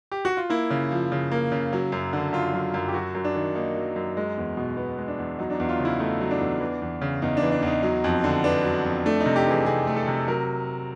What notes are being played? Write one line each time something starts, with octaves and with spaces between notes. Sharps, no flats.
G4
F#4
F4
A#3 E4
C#3
F3
C#3
A#3
C#3
F#3
F#2
D3
F#2 F4
F#3
F#2
G4
F#3 F#4
F#2
D4
D#3
A#3 D#4
F#3
F#2
G#3
E2
B2
B3
G#3
D4
E2
F#3 D#4
D4
E2 D#4
F4
C#3
E4
A3 D#4
F#3
D4
E2
E3
E2
C#3
E2 D#4
D4
E3
D4
E2 D#4
F#3
F2
D3
B3 D4
F#3
F2
A3 D4
D#4
C3
G4
E3 G#4
C3 G#4
A3
A4
C3
F#3 A#4